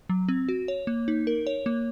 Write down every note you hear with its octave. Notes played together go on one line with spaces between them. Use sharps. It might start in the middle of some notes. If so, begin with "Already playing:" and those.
F#3
C4
F#4
C#5
A#3
D#4
A#4
C#5
A#3